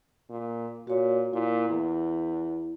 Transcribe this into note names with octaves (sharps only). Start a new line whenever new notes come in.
A#2
A#2 F#4 C#5
A#2 E4
E2